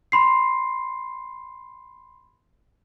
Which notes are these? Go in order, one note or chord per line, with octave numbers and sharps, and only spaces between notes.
B5 C6 C7